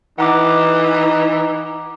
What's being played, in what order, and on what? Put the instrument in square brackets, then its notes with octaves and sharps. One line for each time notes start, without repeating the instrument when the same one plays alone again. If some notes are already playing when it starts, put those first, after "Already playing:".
[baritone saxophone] E3 [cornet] D#4 [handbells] F#5 A#5 D6